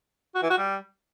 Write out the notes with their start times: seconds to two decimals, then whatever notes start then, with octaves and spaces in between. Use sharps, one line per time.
0.35 F#4
0.42 E3
0.50 F#4
0.58 G3